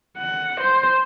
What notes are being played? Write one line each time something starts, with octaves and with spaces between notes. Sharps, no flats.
F#5
C5